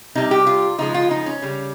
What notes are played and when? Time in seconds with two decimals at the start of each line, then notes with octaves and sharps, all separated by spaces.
0.15 C3 G3 D#4
0.31 G4
0.47 F4
0.79 C#3 F3 G#3 D#4
0.94 F4
1.11 D#4
1.26 C#4
1.42 C#3 G3